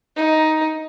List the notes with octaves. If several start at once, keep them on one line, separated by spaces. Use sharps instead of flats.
D#4